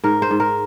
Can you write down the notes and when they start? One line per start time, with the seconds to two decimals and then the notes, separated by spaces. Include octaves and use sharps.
0.04 G#2 A#4
0.22 C5
0.31 G#2
0.40 A#4